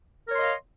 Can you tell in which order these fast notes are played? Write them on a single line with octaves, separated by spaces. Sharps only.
A#4 C#5 C6 D#5 F5